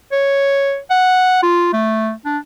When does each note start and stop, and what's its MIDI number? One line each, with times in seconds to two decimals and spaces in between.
0.12 0.78 73
0.90 1.42 78
1.43 1.69 65
1.73 2.12 57
2.25 2.38 62